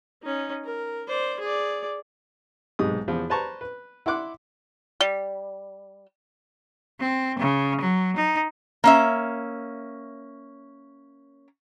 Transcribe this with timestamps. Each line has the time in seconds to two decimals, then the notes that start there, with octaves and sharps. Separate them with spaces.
0.23 C#4 D#4
0.65 A#4
1.08 C5 D5
1.40 G#4 D5
2.79 B1 G#2 C3 D#6
3.08 E2 F3
3.30 B4 C5 A5 A#5 C#6
3.61 B4
4.06 E4 F#5 C6 D6 F#6
5.00 G3
7.00 C4
7.39 C#3
7.81 F#3
8.16 D#4
8.84 A#3 C#4 E5